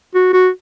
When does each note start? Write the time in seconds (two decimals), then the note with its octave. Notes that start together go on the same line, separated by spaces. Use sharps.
0.15 F#4
0.33 F#4